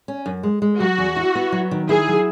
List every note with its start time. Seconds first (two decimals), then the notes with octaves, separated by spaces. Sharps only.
0.08 C#4
0.26 F#2
0.43 G#3
0.62 G#3
0.80 F#3 F#4
0.98 E2
1.16 E4
1.35 B3
1.52 F#3
1.71 D#3
1.89 E4 G#4
2.08 F#3